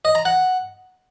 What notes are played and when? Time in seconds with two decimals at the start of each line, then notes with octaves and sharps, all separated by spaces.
0.05 D#5
0.15 A#5
0.25 F#5